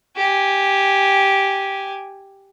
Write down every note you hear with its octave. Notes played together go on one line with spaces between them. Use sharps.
G4 G#5